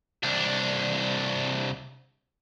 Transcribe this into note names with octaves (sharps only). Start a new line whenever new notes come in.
C2 D4